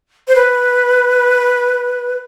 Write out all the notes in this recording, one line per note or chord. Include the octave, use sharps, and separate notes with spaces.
C5
B4